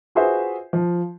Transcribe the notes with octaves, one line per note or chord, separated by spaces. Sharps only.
F4 F#4 G#4 B4 C5 E5
F3